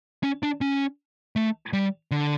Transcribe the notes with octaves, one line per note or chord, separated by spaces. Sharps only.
C#4
D4
C#4
A3
G3
D3